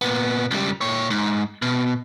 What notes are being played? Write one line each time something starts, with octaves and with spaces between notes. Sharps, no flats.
A#2 B3
C#2 G3
A#2 C#5
G#2
B2